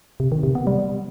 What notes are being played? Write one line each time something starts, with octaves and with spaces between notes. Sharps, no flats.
C3
D#3
C3
B3
G3